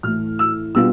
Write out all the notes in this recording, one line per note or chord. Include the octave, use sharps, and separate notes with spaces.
A2 E3 A3 F6
E6
B2 G3 B3 D4 F4 E6